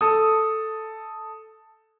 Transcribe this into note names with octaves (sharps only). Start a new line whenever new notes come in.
A4 D#6